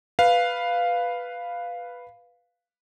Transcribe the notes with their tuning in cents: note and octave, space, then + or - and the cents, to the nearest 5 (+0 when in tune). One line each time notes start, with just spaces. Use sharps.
B4 +0 F5 +0